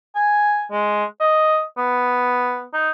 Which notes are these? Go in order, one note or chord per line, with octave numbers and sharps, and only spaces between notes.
G#5
G#3
D#5
B3
D#4